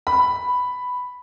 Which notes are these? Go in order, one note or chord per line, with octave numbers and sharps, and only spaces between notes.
B5